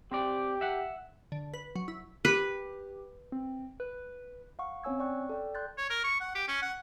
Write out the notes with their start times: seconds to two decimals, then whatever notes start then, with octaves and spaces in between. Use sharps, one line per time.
0.12 C4 G4 D5
0.61 E5 F#5
1.32 D3
1.54 B4
1.76 F#3
1.88 E4
2.25 G4 B4
3.32 C4
3.80 B4
4.59 F5 F#5 C#6
4.84 C4 C#4 C#5 G#5 E6 G#6
4.99 D5 G5 C#6 F#6
5.29 A4 D5 G5
5.55 D5 C6 F#6 G6 A6
5.78 C#5
5.90 A#4
6.04 C#6
6.20 F#5
6.35 G4
6.48 C#4
6.62 F#5